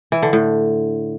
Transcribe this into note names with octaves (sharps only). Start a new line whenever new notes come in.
E3
D3
A2